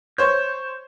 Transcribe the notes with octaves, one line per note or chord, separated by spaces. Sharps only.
C5 C#5 G6